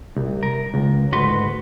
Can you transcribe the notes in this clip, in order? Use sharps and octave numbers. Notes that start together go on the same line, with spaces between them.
C2
A#4
C#2
D2 G#2 F#4 B4 C6